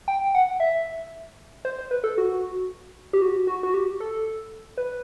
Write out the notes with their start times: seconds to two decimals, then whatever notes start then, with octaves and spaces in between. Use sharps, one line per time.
0.08 G5
0.35 F#5
0.60 E5
1.65 C5
1.78 C5
1.91 B4
2.04 A4
2.18 F#4
3.13 G4
3.22 F#4
3.47 F#4
3.63 F#4
3.74 G4
4.00 A4
4.78 B4